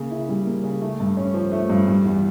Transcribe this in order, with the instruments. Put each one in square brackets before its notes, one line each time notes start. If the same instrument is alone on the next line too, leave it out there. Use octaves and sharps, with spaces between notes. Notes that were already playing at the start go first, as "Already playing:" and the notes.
Already playing: [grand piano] C#3 A#3
E4
G3
A#3
C#3
A3
G2
C#4
F3
A3
G2
G3
E2